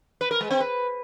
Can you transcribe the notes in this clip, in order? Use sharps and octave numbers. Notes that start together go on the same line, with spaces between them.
B4
A#4
G#3
C4
B4